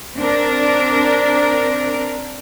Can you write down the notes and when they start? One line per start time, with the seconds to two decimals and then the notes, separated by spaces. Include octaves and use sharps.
0.16 C4 D4 A#4